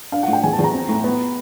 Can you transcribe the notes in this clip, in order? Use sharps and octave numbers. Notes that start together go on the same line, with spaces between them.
D4 F5
F#5
A2
G5
E2 G#5
A5
E2
A#5
C4
A2
B3